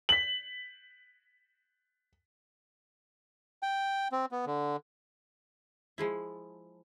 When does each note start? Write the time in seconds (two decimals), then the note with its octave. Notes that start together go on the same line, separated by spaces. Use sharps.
0.09 B6 F#7
3.63 G5
4.12 C4
4.32 B3
4.46 D3
5.98 F3 G#3 E4